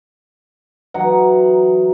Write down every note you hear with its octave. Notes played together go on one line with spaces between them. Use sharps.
E3 F#3 D#4 F#5